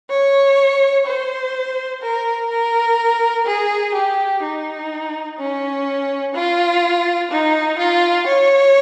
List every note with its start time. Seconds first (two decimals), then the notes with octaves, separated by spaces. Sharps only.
0.10 C#5
1.06 C5
2.02 A#4
2.50 A#4
3.46 G#4
3.94 G4
4.43 D#4
5.38 C#4
6.35 F4
7.31 D#4
7.79 F4
8.27 C#5